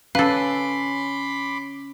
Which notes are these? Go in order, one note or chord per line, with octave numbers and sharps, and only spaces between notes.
C#4 A4 B4 F5 B5 C6 D6